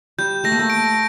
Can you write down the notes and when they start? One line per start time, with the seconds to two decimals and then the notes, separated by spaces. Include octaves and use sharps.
0.18 G3 G6
0.44 A3 A#6
0.52 A#3
0.59 A3
0.70 D7